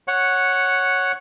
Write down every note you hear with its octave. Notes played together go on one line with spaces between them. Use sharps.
C#5 F#5